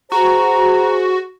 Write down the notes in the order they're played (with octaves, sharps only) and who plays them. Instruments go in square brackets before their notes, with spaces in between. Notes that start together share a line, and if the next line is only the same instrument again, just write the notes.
[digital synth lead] F#4 [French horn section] G#4 C5 [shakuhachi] A#5